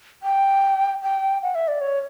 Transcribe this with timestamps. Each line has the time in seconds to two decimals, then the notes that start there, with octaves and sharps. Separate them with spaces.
0.23 G5
1.02 G5
1.43 F#5
1.55 E5
1.68 D5
1.81 C#5